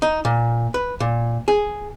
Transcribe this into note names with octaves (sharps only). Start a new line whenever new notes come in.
D#4
A#2
B4
A#2
G#4